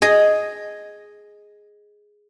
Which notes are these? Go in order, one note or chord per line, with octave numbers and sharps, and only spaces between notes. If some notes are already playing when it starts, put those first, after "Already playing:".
G#4 D#5